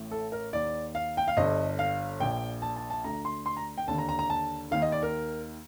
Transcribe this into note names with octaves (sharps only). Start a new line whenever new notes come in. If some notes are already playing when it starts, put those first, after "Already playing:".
Already playing: A1 A2
A4
A#4
D#2 D#3 D5
F5
G5
F5
G1 G2 D3 D#5
F5
A#1 A#2 G5
A5
A5
A5
D2 D3 A#5
C6
C6
A#5
G5
D#2 D3 A5
A#5
A#5
A#5
A5
D#2 D#3 F5
D#5
D5
A#4